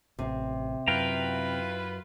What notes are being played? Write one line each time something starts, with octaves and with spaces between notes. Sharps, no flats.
A1 C3
F#2 E4 F4 B4 F5 G5 A#5